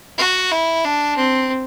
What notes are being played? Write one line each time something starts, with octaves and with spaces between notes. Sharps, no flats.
F#4
E4
D4
C4